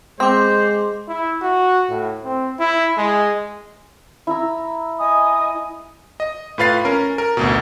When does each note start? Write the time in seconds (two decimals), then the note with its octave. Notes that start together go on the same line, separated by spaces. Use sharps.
0.20 G#3 C4 C5 C6 D6
1.08 E4
1.42 F#4
1.90 A2
2.24 C4
2.59 E4
2.97 G#3
4.27 E4 A#5 E6
4.98 D#5 G#5 D#6
6.20 D#5
6.58 A2 F4 B4 F5 A6 C7
6.85 C#4 A#4
7.18 A#4
7.37 A1 D2 B2